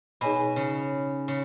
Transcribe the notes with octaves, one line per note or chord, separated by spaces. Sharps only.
B2 D#4 G#4 C#5 G#5 B5
C#3
C#3